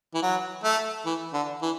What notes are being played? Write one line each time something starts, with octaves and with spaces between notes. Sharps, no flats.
E3
F#3
A3
E3
D3
E3